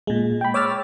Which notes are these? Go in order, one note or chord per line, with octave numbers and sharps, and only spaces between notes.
A#2 G#3
G5 B5
C#5 D6 E6 F6 A6